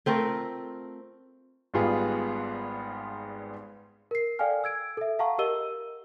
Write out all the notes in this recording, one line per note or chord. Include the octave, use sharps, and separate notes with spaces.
A3 C4 F4 A#4
G#1 G#2 G3 B3 F4 G#4
A#4 C7
A4 D5 F5 G5 G#5 F6
E6 G#6 D7
A4 E5
F5 F#5 A5 A#5 C#6
G4 A#4 D#5 E6 D#7 G7